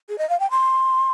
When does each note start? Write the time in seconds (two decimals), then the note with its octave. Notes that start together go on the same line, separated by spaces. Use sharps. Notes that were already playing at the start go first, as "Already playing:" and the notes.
0.09 G#4
0.18 D#5
0.30 F5
0.40 G5
0.51 C6